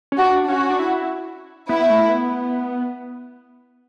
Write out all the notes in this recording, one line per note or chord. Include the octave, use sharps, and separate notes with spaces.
C#4
D4 F#4
C#4 F#4
D4
E4
B3 E4
A3
B3